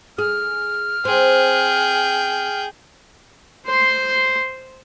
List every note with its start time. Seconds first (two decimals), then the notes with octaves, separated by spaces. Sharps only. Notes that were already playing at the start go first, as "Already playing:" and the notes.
0.18 G#4 F6
1.05 C4 G#4 G5
3.66 C5 C6